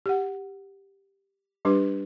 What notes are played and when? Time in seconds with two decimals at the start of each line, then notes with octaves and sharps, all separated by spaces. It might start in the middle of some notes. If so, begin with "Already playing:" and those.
0.06 G4 F#5
1.65 G3 D4 G4 B4 D6